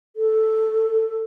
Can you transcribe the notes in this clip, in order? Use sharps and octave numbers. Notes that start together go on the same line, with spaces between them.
A4